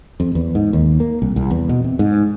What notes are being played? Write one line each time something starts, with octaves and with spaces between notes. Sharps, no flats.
F2
E2
G#2
D#2
A#3
C2
C2
E2
B2
C3
G#2